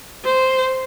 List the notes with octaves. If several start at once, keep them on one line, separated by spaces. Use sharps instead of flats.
C5